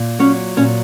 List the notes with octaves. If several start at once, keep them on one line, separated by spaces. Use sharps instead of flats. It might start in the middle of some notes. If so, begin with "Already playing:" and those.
Already playing: A#2
F#3 C#4
A#2 C#4